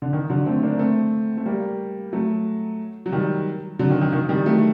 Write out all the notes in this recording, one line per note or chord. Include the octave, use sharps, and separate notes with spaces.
D3
D#3
D3 F#3
A3 C4
A#3 D4
A3 C4
A3
G3 A#3
F#3 A3
F#3
D#3 G3
D3 F#3
D#3
D#3
D#3
D#3 G3
F#3 A3